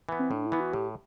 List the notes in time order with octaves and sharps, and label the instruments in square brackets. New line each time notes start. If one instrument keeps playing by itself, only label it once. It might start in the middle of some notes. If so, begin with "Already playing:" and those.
[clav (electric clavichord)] E3 B3
[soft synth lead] C4
[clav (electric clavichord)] A2 [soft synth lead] D4
[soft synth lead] E4
[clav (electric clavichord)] E3 B3
[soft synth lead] F#4
[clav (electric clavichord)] A2 [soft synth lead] G4